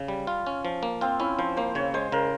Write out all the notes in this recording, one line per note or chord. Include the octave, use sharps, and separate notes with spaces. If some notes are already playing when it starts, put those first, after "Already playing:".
Already playing: C#3
G3
F4
C#4
F3
A#3
C4 F4
C#4 E4
F3 C5
A#3 C5
C#3 C#5
G#3 C5
C#3 A#4